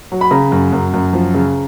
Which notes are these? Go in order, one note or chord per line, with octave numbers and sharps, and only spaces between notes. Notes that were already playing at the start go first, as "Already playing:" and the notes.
F#3
B5
C#3 A#5
F#2
F#2
F#2
F3
C#3